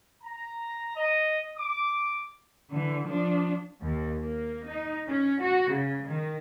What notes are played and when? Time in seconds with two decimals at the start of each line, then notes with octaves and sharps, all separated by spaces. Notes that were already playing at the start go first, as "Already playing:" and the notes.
0.23 A#5
0.96 D#5
1.58 D6
2.70 D3 E3
3.07 F3 D4
3.81 D#2
4.20 A#3
4.66 D#4
5.06 C#4
5.39 F#4
5.70 C#3
6.06 D#3